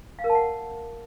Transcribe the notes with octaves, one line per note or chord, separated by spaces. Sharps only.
F5
A#4
A5
F#5